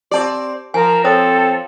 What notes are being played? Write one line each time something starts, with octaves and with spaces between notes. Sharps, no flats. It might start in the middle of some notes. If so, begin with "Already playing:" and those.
C4 G4 D5 A5
F3 A#4 G#5
C4 A4 C5 C#5 D#6